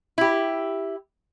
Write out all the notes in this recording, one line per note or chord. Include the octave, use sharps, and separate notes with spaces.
E4 G4